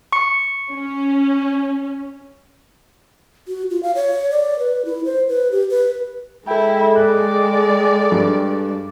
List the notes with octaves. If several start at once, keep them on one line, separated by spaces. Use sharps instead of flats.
C#6 C#7
C#4
F#4
F4
F5
C#5
D5
B4
E4
C5
B4
G4
B4
G#3 E4 A4 G5
D5 F#6
G2